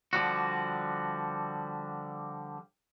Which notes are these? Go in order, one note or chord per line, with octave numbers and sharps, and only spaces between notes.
D3 F3 G3 F#4